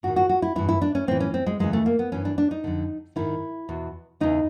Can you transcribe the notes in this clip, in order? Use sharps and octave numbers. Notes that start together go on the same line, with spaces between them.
G#2 D#3 F#4
F#4
F#4
E4
G2 E3 E4
E4
D4
C#4
A2 E3 C4
C#4
C4
G#3
E2 C#3 E3 G#3
A3
A#3
B3
G2 E3 C#4
D4
D4
D#4
F2 D3
G#2 D#3 E4
E2 B2
E2 C#3 E3 D#4